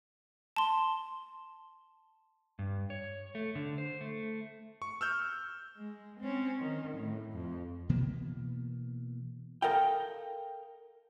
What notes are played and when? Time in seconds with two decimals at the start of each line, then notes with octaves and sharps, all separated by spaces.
0.56 A5 C6
2.59 G2
2.90 C#5
3.35 A3
3.55 D3
3.78 C5
4.01 A3
4.82 C#6
5.01 E6 F6 G6
5.77 G#3
6.20 C4 C#4
6.60 D#3
6.97 A2
7.32 F2
7.89 B2 E3 A#3 B3
9.62 A4 A#4 D#5 F5 G5